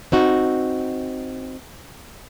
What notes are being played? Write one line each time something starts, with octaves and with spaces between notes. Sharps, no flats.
C4 D#4 F#4